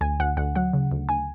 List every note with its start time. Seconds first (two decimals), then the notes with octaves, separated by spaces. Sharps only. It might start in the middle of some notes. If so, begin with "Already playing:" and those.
0.01 D2 G#5
0.20 D2 F#5
0.37 D2 F#5
0.56 F#3 F#5
0.73 C#3
0.92 D2
1.09 D2 G#5